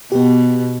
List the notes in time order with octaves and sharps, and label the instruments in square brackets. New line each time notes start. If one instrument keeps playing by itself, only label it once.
[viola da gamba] B2 [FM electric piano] B3 G4